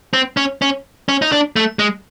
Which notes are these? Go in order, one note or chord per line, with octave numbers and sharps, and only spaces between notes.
C4
C#4
C#4
C#4
D#4
D4
A3
G#3